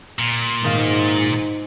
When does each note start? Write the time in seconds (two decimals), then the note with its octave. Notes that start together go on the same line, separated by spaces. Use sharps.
0.19 A#2
0.64 G#2 D#3 F5